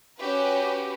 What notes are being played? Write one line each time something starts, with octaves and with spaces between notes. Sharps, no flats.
C#4 F#4 G4 B4